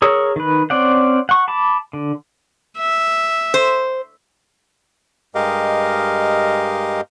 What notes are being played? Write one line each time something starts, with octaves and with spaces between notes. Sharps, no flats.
G#4 A#4 C#5 E6
D#3 B4
C4 C#4 D5 F#5
F#5 C#6
A5 B5 D6
D3
E5
C5
G2 G#3 G4 A#4 D#5 F5